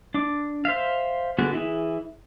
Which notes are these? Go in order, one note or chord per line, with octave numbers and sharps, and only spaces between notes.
D4 D6
C5 E5 F5
D3 B3 F#4 G#4
E3 E4 G#4